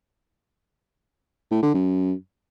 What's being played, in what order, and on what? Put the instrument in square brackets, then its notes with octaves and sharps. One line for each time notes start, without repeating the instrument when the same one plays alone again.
[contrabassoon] A2
D3
F#2